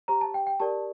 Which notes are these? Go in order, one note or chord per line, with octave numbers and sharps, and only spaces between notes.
G4 C5 A#5
A5
G5
G5
G4 A#4 D5 A5